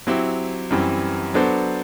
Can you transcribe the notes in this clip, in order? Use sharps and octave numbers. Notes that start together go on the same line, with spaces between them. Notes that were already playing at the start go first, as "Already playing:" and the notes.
F#3 C4 E4 G4
F#2 E3 G3 C4
F#3 B3 D4 A4 C5